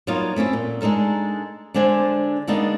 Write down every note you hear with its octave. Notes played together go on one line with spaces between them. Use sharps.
F#3 G3 A#3 B3 D#4 F4
A3 C4 C#4 E4
A#2
G#3 D4 D#4 A4 A#4
D3 G#3 D4 C5 G#5
D3 G#3 A#3 B3 D4 D#4